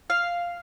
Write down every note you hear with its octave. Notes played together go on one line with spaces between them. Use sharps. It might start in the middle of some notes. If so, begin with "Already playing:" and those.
F5